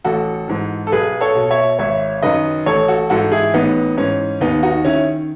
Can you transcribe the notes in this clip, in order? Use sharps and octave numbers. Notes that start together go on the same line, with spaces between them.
A1 F#4 A4
G#2 E3
A4
B1 G#4 B4
A4 C#5
B2
C#5 E5
G#1 C#5 E5
F#2 D#3 B4 D#5
A1 A4 C#5
F#4 A4
G#2 E3 F#4 A4
E4 G#4
A1 B3 D#4
G#2 E3 C#4
D#2 B3 D#4
D#4 F#4
D#3 C#4 E4